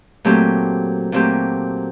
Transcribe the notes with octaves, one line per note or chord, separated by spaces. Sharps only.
A#2 F#3 A3 C4 G4
A#2 F#3 A3 C4 G4